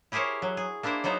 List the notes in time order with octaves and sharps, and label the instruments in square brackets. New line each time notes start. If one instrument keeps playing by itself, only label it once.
[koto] E4 G4 G#4 A#4 C5 C#5
F#3
G#4
A#3 D4 E4 A#4 C5
F#3 B3 D#4 C5 A#5